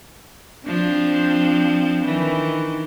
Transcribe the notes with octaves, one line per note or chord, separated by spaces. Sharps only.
F3 C4 D4
D#3 E3